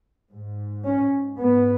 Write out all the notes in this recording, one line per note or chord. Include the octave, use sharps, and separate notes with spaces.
G#2
C#4
G#2 B3